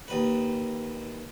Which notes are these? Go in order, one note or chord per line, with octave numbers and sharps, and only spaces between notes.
D#2 B4